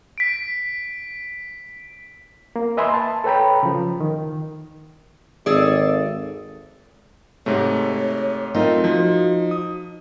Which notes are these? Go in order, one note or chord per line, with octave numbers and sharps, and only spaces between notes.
B6 D7
A#3
B4 D#5 E5 G#5 B5 C6
A5
A4 B4 C#5 G5 A#5 B5
C#3 F3
D#3
G#1 G#4 A4 D5
G#2 C3 A3 C#5
A3 C4 D#4 F4 A#4
F3 F#4
D#6